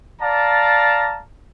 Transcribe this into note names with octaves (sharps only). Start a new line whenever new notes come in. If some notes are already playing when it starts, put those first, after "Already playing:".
D5 F5 A5 A#5